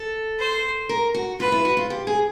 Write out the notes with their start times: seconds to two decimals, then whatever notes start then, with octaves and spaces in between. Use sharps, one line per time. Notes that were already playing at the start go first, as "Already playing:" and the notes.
Already playing: A4
0.39 C5
0.89 A#4
1.15 F#4
1.40 F4 B4
1.52 E4
1.65 F#4
1.77 F4
1.90 G4
2.07 G#4